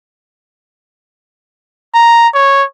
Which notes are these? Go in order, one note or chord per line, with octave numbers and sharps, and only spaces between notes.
A#5
C#5